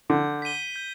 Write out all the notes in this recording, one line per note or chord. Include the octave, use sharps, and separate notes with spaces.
D3 G6
B6 D#7 G7
G6